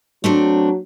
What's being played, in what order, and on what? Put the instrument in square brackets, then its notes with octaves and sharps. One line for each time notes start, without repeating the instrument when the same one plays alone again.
[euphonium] F#3 [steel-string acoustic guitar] A3 C4 D4